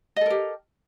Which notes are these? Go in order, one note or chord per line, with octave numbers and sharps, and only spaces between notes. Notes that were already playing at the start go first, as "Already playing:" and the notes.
G4 A4 A#4 D#5